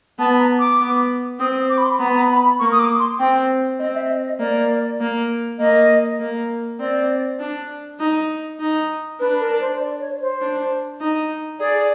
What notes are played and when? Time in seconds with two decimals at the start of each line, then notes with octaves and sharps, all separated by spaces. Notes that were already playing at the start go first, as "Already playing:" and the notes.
0.19 B3 A5
0.39 A#5
0.60 D6
0.80 B3
1.40 C4 D#6
1.70 D6
1.78 B5
1.85 C6
1.99 B3 A#5
2.07 B5
2.15 A#5
2.29 B5
2.59 A#3 C#6
2.72 D#6
2.79 D6
3.00 C6
3.19 C4 G5
3.79 C4 D#5
3.95 E5
4.10 D#5
4.24 D#5
4.39 A#3 D5
5.00 A#3
5.59 A#3 D#5
6.20 A#3
6.80 C4 D5
7.40 D4
7.99 D#4
8.60 D#4
9.20 D4 B4
9.40 A#4
9.60 C5
9.80 D5
10.00 C#5
10.21 C5
10.41 D4
11.01 D#4
11.60 G#4 D5